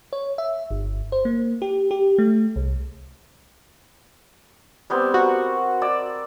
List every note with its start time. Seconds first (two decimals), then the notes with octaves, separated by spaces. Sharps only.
0.13 C#5
0.38 E5
0.71 G1
1.12 C5
1.25 A#3
1.62 G4
1.91 G4
2.18 A3
2.56 C2
4.90 G3 B3 C4
5.14 F#4 A#4 F#5
5.82 D5 E6